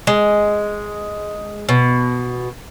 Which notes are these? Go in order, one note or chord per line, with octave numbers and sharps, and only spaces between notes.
G#3
B2